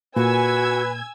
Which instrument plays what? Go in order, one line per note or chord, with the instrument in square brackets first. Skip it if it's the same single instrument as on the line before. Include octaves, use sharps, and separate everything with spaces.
[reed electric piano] A#2 [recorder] F#4 [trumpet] B4 [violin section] G#5 E6 G#6